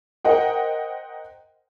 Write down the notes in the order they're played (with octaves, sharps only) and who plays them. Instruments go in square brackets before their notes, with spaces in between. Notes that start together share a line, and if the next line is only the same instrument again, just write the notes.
[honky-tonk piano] A#4 C5 D#5 F#5 G5